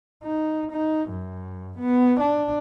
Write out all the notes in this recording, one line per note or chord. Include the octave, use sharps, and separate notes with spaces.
D#4
D#4
F#2
B3
D4